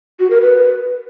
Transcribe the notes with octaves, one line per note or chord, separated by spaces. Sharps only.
F#4
A#4
B4